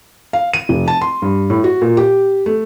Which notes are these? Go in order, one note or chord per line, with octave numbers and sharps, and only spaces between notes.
F5
D#7
F1
A5
C6
G2
A2
F#4
A#2
G4
A3